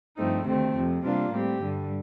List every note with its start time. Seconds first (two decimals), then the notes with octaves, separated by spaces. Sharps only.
0.18 G2 F3 A3 C4 D#4
0.46 D2 C3 D#3 A3 C4
0.75 F2 C3 F3
1.04 C3 G3 A#3 D4 F4
1.32 A2 G3 C4 G4
1.61 G2 D3 G3